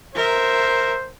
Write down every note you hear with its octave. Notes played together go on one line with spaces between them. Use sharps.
A#4 C5 E5